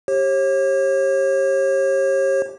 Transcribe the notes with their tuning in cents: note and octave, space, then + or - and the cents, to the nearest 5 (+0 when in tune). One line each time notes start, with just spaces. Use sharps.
G4 +0 C#5 -40